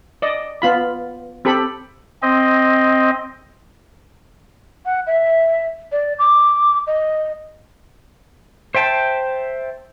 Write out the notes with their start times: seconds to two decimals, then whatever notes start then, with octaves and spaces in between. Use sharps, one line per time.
0.22 D5 D#5
0.62 B3 F4 B5
1.45 C4 G4 A4 B5
2.22 C4 D#5
4.85 F#5
5.07 E5
5.92 D5
6.19 D6
6.87 D#5
8.75 C5 E5 G5 A5